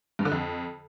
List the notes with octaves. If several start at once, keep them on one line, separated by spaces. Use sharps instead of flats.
G2
D3
F2